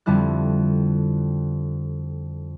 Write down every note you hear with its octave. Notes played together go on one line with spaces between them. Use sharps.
F2 D3 G3 E4 F#6